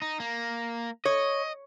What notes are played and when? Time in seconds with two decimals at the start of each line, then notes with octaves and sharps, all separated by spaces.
0.02 D#4
0.20 A#3
1.05 C#5 D#5